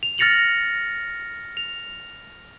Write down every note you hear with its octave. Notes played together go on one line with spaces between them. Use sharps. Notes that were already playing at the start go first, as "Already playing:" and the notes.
F7
F6 A6 A#6 C#7 F7 F#7
F7